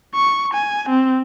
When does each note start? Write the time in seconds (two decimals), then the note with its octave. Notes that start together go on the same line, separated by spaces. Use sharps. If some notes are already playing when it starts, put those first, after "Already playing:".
0.14 C#6
0.54 G#5
0.89 C4